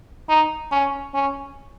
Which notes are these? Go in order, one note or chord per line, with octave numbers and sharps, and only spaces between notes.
D#4
C#4
C#4